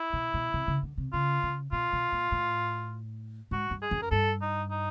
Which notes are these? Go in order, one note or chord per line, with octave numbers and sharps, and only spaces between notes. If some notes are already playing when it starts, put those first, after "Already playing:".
Already playing: E4
B2
B2
C3
C#3
D3
C3
C#3 F4
C#3
B2 F4
B2
A#2
A2
G#2 F#4
G2
G#4
F#2
A#4
G2 A4
D#4
D#4